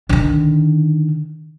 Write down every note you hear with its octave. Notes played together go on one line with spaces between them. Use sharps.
D3 D#3